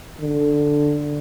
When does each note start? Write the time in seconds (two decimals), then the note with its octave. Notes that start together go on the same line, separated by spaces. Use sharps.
0.21 D3